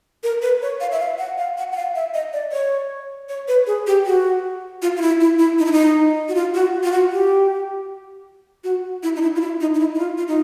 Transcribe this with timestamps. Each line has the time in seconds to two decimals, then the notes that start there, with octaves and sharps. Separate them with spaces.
0.23 A#4
0.42 B4
0.62 C#5
0.80 F5
0.92 E5
1.00 F5
1.18 F#5
1.38 F5
1.57 F#5
1.72 F#5
1.76 F5
1.95 E5
2.14 D#5
2.33 D5
2.52 C#5
3.29 C#5
3.48 B4
3.67 G#4
3.87 G4
4.06 F#4
4.82 F4
4.97 F4
5.01 E4
5.21 E4
5.39 E4
5.59 D#4
5.65 E4
5.72 D#4
6.28 F#4
6.35 F4
6.54 F#4
6.84 F4
6.92 F#4
7.12 G4
8.64 F#4
9.03 E4
9.16 D#4
9.21 E4
9.36 F4
9.41 E4
9.61 D#4
9.74 D#4
9.79 E4
9.95 E4
9.99 F4
10.18 F4
10.28 D#4